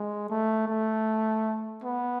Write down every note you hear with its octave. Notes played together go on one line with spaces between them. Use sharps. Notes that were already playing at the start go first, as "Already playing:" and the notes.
Already playing: G#3
A3
A3
B3